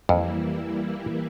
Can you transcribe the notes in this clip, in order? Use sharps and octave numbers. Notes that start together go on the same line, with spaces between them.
F2 E3 G3 A#3 E4